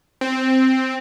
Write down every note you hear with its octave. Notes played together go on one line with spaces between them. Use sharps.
C4